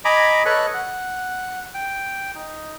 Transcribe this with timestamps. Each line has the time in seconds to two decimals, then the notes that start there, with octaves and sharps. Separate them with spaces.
0.05 D#5 G#5 A#5 B5 D6
0.46 A4 B4 C#5 D#5 C#6 F#6
0.74 F#5
1.74 G5
2.36 D#4